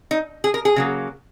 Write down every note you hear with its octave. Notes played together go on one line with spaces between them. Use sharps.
D#4
G#4
A#4
G#4
C#3 F#3 A#3